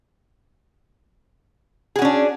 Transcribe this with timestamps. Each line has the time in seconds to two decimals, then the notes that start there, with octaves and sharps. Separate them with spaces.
1.96 G#4
1.99 F#4
2.02 C#4
2.05 D4